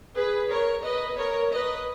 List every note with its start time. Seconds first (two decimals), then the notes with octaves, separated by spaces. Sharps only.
0.16 G#4 B4
0.51 A#4 C#5
0.85 B4 D#5
1.19 A#4 C#5
1.53 B4 D#5